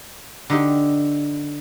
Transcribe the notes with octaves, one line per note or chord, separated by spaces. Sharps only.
D3 D#4 G4